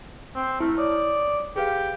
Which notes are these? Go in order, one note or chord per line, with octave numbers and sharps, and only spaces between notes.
C4
A3 E4 F6
C#5 D5 D#6
G4 G#4 B4 F5